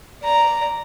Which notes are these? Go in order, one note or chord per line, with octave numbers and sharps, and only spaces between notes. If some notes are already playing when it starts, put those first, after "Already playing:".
D5 A#5